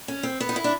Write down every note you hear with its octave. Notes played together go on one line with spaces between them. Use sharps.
C#4
C4
B3
D#4
E4
D4